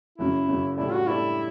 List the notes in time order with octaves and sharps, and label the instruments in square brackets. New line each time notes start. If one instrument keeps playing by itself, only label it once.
[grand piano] F#1 F#2 C#3 [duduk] E4
[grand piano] F#1 F#2 C#3
[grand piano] A2 G3 D4 A4 D5 [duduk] E4
[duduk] F#4
[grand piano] A2 G3 D4 A4 D5 [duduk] E4